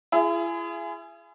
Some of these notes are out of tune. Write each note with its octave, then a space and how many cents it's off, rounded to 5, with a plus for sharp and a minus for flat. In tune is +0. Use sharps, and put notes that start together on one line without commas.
E4 +45 G#4 +5